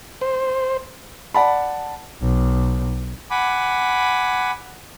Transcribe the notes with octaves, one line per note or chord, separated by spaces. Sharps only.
C5
D5 F#5 A5 B5
B1
F#5 G#5 B5 D6